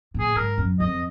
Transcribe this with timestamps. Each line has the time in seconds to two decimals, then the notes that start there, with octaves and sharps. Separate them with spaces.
0.14 A#2
0.20 G#4
0.36 G#2 A#4
0.58 F#2
0.80 F2 D#5